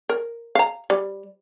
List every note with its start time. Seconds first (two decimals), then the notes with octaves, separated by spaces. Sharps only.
0.09 A#4
0.55 F5 A#5
0.90 G3